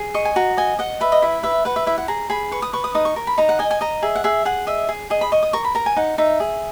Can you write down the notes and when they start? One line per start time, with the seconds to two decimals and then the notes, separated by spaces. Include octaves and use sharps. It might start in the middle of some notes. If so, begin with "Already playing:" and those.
Already playing: G#4
0.14 D#5 C#6
0.25 G#5
0.36 F#4 A#5
0.57 D#5 G#5
0.79 D#5 F#5
1.01 B4 E5
1.12 D#5
1.22 E4 E5
1.43 B4 E5
1.65 B4 F#5
1.76 E5
1.87 E4 E5
1.98 F#5
2.08 G#4 A#5
2.30 G#4 B5
2.51 B4 C#6
2.62 D#6
2.73 B4 C#6
2.84 D#6
2.95 D#4 D#6
3.05 C#6
3.16 A#4
3.27 B5
3.38 D#4 A#5
3.49 F#5
3.59 D#5 G#5
3.71 G#5
3.81 D#5 A#5
4.02 G#4 E5
4.15 F#5
4.24 G#4 E5
4.45 G#4 F#5
4.67 D#5 E5
4.89 G#4
5.10 G#4 D#5
5.21 B5
5.32 D#5 C#6
5.43 D#6
5.53 A#4 C#6
5.65 B5
5.75 A#4 A#5
5.86 G#5
5.96 D#4 F#5
6.18 D#4 E5
6.40 G#4